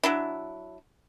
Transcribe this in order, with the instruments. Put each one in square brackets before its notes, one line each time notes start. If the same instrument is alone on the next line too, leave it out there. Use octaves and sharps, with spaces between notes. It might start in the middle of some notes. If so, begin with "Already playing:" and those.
[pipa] F#3 D4 E4